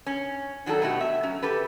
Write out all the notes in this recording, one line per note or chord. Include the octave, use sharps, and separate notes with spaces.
C#4
D#3 F#3 D4 G#4 A4
B2 A3 F#4 G4
E5
F#3 C#4
G4 A4 B4